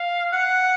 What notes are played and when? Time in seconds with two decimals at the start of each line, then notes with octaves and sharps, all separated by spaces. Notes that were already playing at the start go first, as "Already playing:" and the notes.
Already playing: F5
0.32 F#5